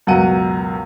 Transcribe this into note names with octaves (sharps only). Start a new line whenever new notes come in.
C#2 F#2 B2 F#5 D#7